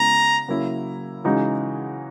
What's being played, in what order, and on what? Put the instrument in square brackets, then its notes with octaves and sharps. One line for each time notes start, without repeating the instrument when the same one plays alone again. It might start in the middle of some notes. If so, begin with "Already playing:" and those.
Already playing: [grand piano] C#3 G#3 B3 E4 [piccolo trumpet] A#5
[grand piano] C#3 F#3 A#3 E4
C#3 E3 G#3 D#4 F#4